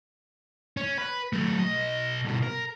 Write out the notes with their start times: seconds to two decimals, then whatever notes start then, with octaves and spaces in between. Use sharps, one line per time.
0.77 C#4
0.98 B4
1.33 F#3 A3
1.59 B1 D#5
2.25 G2 B2
2.43 A#4